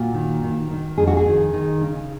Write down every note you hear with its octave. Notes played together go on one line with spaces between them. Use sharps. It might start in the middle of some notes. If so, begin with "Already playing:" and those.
Already playing: A#2 F#4
D#3
D#3
D#3
F2 G#4
F#4
G#4
D#3
D#3
C#3